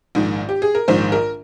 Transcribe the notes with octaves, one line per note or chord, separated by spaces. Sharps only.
A#1 G#2 D#3
G4
G#4
A#4
A#1 G#2 D#3 C5
A#4